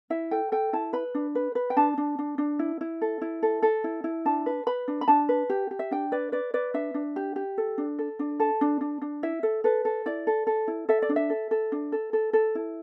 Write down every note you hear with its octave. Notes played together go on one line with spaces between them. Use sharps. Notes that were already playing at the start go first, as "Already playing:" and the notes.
E4 E5
A4 G5
A4 G5
E4 A5
B4 B5
D4
B4
B4
G5
D4 A5
D4
D4
D4
E4
E4
A4
E4
A4
A4
E4
E4
D4 A5
B4
B4 B5
D4
B5
D4 A5
B4
G4
G4
E5
D4 G5
B4 D5
B4 D5
B4 D5
D4 E5
D4
G4
G4
A4
D4
A4
D4
A4 A5
D4
D4
D4
E4 E5
A4
A4 B4
A4
E4 D5
A4
A4
E4
A4 E5
D5
D4
E5
A4
A4
D4
A4
A4
A4
E4